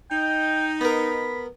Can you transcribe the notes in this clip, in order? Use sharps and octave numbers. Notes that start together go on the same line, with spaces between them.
D#4 G5
B3 A#4 B5